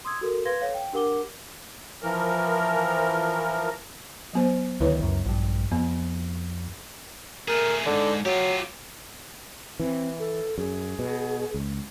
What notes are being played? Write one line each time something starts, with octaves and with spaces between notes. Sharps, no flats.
C6 D#6 E6 G#6
F#4 A4 A#4
B4 F5 C6 G#6 A#6 G7
A4 C#5 F5
G5
D4 G4 A#4 F#5 D6 G7
E3 F3 A#4
F#3 B3 C5
D2 D#3 E4 B4 C#5
C#2 F#2
A#1 G2
F2 B3
A3 G#4 A#4
D#2 G#2 D3
F#3 F4 G4
E3 C4
A4
F#2 G#4
B2
C#2